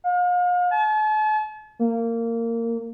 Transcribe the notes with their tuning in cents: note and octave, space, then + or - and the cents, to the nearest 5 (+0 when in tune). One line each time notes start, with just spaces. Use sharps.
F5 +40
A5 -45
A#3 -20